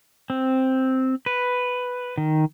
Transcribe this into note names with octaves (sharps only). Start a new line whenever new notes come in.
C4
B4
D#3